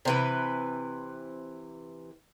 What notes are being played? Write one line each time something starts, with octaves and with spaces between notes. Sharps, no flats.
C3 E3 B4